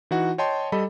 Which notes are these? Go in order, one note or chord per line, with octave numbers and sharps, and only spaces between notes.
E3 D#4 F#4 F#5
C#5 D#5 G5 A5 C6
G3 A4 D#5 B5